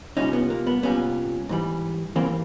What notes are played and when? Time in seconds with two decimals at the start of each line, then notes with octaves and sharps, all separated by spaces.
0.17 C2 A#2 G3 C#4 D#4
0.33 B3
0.50 A#3
0.67 B3
0.83 C2 A#2 G3 B3 C#4
1.49 G#2 E3 G3
2.16 G#2 E3 G3 A#3 C4